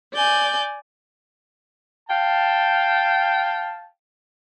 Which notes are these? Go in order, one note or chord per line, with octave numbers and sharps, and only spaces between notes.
D5 G#5 G6
F5 G5 A5